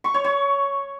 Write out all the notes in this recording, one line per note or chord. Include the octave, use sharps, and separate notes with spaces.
C#6
C#5
C#5